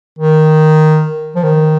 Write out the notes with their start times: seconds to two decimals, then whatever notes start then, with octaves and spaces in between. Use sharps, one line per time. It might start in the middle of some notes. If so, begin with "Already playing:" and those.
0.19 D#3
1.35 F3
1.44 D#3